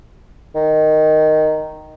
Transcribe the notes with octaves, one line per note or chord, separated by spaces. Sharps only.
D#3